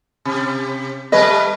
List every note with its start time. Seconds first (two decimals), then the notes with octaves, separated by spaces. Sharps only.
0.25 C3
1.12 G3 A3 B4 D#5